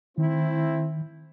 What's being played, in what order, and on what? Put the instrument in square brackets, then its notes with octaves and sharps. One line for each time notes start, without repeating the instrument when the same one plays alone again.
[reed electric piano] D#3 [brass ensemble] A3 C4 E4